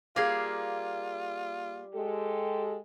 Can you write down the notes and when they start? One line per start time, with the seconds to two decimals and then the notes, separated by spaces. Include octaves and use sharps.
0.16 G3 A#3 F4 G#4 F5
1.94 G#3 G4 A4